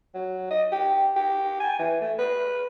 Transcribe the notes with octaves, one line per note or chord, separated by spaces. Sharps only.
F#3
D#5
G4
G4
G#5
E3
A3
B4